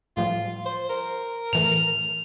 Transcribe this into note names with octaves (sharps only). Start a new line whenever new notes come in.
A2 F3 G3 F4
C5
A#4
A2 E3 A3 F7